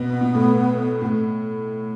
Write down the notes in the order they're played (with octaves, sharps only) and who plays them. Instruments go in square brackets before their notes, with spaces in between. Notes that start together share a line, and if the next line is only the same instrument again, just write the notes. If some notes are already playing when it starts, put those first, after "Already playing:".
Already playing: [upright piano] B2 [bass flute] B3
[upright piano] B2
A2
A2